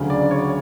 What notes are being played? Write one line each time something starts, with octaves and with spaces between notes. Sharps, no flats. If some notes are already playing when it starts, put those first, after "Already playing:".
Already playing: D2 C#3 F#3
D5
C#5